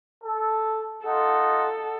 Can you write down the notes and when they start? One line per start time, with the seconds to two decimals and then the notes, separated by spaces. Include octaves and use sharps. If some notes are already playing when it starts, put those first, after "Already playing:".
0.24 A4
1.05 D#4 F4 A4 F#5